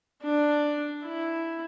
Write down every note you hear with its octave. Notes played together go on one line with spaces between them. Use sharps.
D4
E4